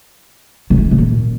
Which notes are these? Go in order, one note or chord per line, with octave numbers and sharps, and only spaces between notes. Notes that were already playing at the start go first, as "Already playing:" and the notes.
C#3
E3
F#2
B2
A#2